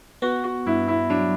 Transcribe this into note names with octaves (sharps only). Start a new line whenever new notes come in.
B3 F#4
F#4
G2 E4
E4
F#3 D4